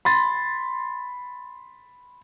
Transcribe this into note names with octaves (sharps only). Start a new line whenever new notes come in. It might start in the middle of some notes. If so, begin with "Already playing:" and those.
B5 C6 A6